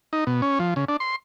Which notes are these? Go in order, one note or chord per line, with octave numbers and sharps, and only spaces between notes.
D#4
B2
C#4
F3
C#3
D4
C6